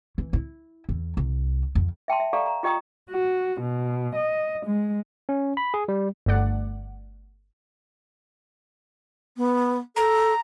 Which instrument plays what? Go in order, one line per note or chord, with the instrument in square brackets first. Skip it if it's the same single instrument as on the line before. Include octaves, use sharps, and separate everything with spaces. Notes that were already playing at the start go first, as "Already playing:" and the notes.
[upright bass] E3
E4
E2
C2
F2
[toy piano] E5 G5 A5 C6
E5
G4 A4 D5 F5 A#5
A#5
F4 G4 D#5 G5 A#5 D#6
[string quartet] F#4
B2
D#5
G#3
[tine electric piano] C#4
B5
G#4
G3
[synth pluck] G1 G2 A3 D5 F#5
[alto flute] B3
[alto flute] A4 [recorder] A#5